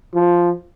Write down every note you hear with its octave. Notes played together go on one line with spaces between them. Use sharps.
F3